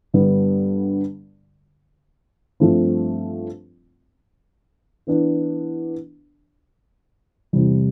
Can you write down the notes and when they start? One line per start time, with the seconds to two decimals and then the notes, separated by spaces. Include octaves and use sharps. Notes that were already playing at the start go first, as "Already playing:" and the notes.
0.14 G2 D3 G3 B3
2.60 G2 F3 A3 C4 F4
5.07 E3 B3 D4
7.53 E2 C3 G3